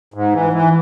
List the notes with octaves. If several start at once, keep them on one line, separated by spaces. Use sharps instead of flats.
G#2
E3
E3